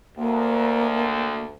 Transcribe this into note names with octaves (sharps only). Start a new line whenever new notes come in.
D2 A#3